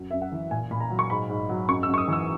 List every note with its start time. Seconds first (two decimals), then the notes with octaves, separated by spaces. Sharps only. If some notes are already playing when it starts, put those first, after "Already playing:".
Already playing: F#2 F#3
0.11 F#2 E5
0.22 F#5
0.32 E3
0.51 A#2 G#5
0.71 A#2 B5
0.80 A#5
0.90 F#3
0.99 C#6
1.10 G#2 B5
1.29 G#2
1.49 F#3
1.68 F#2 C#6
1.83 E6
1.88 F#2
1.94 C#6
1.98 D#6
2.08 E3 E6